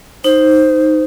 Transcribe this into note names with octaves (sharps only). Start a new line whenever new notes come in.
D#4 C5